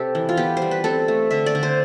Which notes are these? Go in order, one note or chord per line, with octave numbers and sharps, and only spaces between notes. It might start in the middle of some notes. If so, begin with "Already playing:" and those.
Already playing: C3 C4 G4 A4 E5
E3
F4
B3 G4
C5
G3
B4
C4 A4
A3
D3 E5
D5
D3
C5